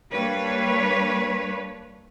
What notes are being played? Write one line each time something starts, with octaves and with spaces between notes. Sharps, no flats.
G3 A#3 D4 B4 C#5